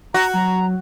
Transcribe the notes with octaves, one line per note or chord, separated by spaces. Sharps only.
F#4 A#5
F#3 A#5